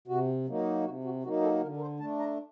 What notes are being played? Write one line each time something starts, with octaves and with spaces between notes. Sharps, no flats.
C3 F#4
F#3 A#3 D#4
C3 F#4
F#4
F#3 A#3 D#4 F#4
A4
D3 A#4
A#4
C5
A3 D4 A5
A#5